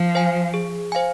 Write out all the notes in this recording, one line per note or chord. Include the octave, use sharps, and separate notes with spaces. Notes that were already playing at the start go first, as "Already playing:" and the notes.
Already playing: F3
C5 F5 G#5
G#4
C5 F5 G#5